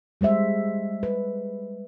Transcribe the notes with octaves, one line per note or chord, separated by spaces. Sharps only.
G3 G#3 C5 E5
B4